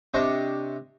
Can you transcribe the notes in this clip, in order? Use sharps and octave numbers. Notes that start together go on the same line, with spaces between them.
C3 D4 C5 D#5 C#6